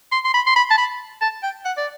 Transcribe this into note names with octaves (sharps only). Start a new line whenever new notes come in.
C6
C6
B5
C6
B5
A5
B5
A5
G5
F#5
D5